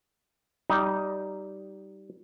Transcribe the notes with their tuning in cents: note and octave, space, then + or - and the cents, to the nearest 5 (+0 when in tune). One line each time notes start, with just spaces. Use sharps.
G3 -15 D#4 +0